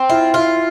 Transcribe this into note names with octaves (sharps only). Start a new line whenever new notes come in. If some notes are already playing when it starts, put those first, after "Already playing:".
Already playing: C4
E4 F4
E4 F4